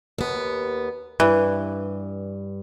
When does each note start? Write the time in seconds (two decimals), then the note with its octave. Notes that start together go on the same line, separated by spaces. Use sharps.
0.18 D#2 B3
1.20 G2 E3